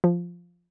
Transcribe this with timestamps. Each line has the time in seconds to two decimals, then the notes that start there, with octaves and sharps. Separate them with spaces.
0.04 F3